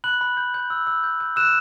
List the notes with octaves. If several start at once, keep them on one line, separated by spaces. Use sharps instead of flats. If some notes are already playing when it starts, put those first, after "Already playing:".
B5 F#6 F#7
B5
G6
G6
E6
E6
G6
G6
E6 F#6 E7